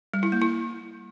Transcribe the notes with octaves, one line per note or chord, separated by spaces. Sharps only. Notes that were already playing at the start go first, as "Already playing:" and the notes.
G3
E4
A#3
E4